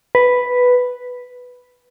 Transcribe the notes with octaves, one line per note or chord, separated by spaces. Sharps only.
B4